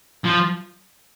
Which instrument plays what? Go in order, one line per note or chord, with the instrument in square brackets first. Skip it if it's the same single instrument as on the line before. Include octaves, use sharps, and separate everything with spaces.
[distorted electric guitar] F3